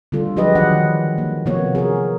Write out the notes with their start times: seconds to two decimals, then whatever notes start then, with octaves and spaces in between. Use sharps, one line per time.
0.12 D3 G3 D4 F4 A4
0.36 F3 F#3 G4 G#4 B4 D#5
0.55 D#3 D4 F#5
1.18 A#3
1.46 C3 F3 A#3 B3 F#4 C#5
1.75 G#4 A#4